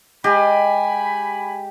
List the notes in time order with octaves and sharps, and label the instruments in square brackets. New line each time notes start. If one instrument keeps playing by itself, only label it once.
[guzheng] G#3 D#5 [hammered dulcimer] G4 [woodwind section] G#5 B5